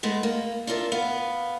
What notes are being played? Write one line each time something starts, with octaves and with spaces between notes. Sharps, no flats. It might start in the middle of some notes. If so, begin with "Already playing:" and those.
G#3 A3 B3
A#3
D4 F4 A4 A#4 D5 E5
B3 F5